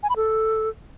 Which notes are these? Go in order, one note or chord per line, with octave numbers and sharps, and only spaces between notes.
G#5
B5
A4